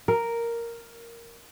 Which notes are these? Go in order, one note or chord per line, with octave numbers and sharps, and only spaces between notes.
A#4